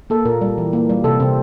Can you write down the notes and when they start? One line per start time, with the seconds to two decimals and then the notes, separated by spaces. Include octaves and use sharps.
0.10 A#3 A4
0.25 A#2 A#4
0.41 G3
0.58 E3
0.73 A#3
0.89 G3
1.04 C3 A4
1.20 C3 C4